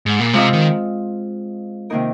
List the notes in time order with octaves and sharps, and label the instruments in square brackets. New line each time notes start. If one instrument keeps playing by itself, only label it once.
[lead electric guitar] G#2
A#2
[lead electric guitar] C3 [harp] G#3 C4 F4 C5 D#5
[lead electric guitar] D#3
[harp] C3 D#3 A#3 D#4 A#4